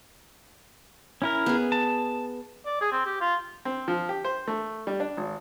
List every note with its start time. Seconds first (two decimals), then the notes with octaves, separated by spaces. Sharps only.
1.22 C#4 E4 A#4
1.46 B3 G#4
1.72 A5
2.66 D5
2.81 G#4
2.92 C4
3.05 G4
3.21 F4
3.65 C4
3.88 F3
4.09 G4
4.25 C5
4.48 A3
4.87 G3
5.00 D4
5.17 G#1